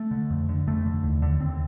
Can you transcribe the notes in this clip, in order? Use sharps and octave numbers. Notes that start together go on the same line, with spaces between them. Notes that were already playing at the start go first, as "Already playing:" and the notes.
Already playing: A3
D3
F2
D3
F2 A3
D3
D#2
D3
D#2 C4